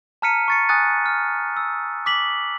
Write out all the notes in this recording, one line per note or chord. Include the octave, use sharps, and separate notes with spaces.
A5 A#5 F6 B6 C#7 D#7
C#6 A6 C#7
G#5 D#6 F#6 A6 D#7
F6
E6
D6 B6 F#7